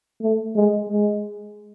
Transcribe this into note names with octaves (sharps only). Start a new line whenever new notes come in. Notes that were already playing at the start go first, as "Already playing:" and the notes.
A3
G#3
G#3